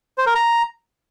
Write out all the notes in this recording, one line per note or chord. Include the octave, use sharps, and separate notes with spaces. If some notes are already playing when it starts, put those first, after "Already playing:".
C5
A#4
A#5